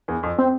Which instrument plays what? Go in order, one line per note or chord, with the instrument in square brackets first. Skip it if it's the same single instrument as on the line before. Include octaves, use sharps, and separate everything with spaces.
[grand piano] E2
F2
[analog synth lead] C4